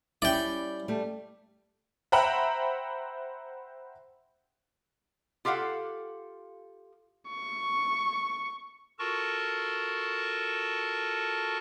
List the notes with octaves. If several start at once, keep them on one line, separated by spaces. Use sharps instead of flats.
G3 C#4 E4 D5 G5
G3 A3
C5 E5 F#5 G5 A#5 B5
F4 G4 A4 F5 F#5
C#6
F4 F#4 A4 A#4 A5 C#6